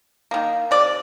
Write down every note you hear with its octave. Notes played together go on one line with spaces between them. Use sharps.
D#3 A#3
C3 D5